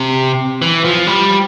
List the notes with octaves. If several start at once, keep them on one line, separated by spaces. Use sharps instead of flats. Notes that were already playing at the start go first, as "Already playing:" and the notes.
Already playing: C3
E3
F3
G3